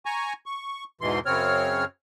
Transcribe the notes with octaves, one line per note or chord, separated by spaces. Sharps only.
G#5 A#5 C#6
C#6
E2 G#2 B2 E3 C6
F#2 C#3 C4 C#5 F6